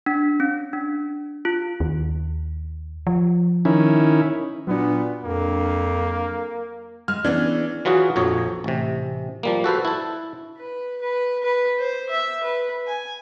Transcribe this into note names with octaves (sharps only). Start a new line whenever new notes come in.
D4
C#4
D4
F4
D#2
F3
D#3 C#4 E4
A#2 F#3 B3 D4
F2 A#3
G#3 F6
E3 B3 C#4 D4 G#4
E3 F#3 F4 F#4 G#4
A#1 F2 F#3 C#5
A1 C3
F3 G3 A#3
F#4 A4 B4 C5
E4 A5
B4
B4
B4
C5
E5
B4
G#5